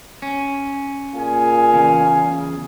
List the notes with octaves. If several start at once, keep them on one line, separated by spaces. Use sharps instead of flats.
C#4
A#2 G#4 F5 G#5
E2 C#3